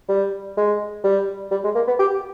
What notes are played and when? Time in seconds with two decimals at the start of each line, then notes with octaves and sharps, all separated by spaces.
0.09 G3
0.57 G#3
1.04 G3
1.51 G3
1.64 G#3
1.75 A#3
1.87 B3
1.99 G4